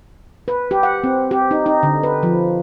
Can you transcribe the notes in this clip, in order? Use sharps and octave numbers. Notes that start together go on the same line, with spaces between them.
B4
G4
F#5
C4
G4
D#4
D#4
D3
B4
F3